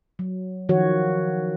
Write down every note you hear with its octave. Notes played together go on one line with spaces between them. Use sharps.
F#3
D#3 F3 F#4 C#5